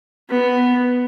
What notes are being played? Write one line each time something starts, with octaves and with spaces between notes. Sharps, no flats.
B3